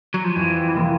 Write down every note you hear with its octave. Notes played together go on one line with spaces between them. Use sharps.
F#3
F3
F2 E3
C3 F3 A#3